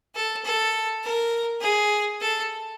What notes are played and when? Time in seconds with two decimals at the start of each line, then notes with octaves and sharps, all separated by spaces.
0.15 A4
0.45 A4
1.03 A#4
1.61 G#4
2.20 A4